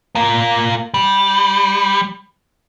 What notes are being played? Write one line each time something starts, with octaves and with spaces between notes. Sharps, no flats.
A#3 F4
G3